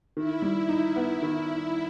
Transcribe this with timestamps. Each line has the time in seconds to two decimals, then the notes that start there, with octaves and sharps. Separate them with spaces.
0.16 D#3 E4
0.42 G3
0.69 D#4
0.96 B3
1.22 D#3